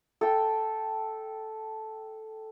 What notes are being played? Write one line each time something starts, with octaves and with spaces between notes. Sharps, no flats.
A4 G5